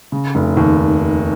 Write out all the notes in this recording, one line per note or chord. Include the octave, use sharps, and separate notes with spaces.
C#3
F1
D#2